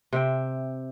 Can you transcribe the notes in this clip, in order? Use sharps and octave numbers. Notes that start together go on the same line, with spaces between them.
C3 E5 G5